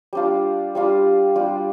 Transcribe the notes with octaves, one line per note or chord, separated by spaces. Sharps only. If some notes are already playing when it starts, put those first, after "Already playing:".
G3 D4 F4
G3 D4 F4
G3 D4 F4